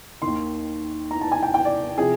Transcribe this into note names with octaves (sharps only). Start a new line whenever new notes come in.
D#2 D#3 C6
A#5
A5
G#5
G5
G5
D5
C3 F3 G#4